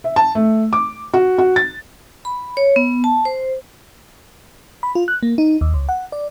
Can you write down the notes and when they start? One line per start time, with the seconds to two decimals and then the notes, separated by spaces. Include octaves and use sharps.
0.04 E5
0.16 A5
0.35 A3
0.73 D6
1.14 F#4
1.38 F#4
1.56 A6
2.25 B5
2.57 C#5
2.76 B3
3.04 A5
3.25 C5
4.83 B5
4.95 F4
5.08 F#6
5.23 A#3
5.38 D#4
5.61 D#2
5.74 C#2
5.89 F#5
6.12 D5